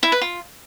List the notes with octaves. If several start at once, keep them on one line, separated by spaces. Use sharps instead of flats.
E4
B4
F4